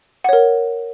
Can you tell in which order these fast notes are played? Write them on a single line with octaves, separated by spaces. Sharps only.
F#5 C#5 A#4